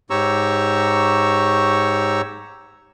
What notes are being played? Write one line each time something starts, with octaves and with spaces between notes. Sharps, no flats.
G#2 G4 C#5 A#5 C#6 E6